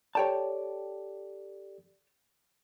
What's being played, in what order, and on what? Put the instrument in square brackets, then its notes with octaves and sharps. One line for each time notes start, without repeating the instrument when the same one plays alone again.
[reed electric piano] G4 A4 D5 [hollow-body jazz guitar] C#5 G5 A5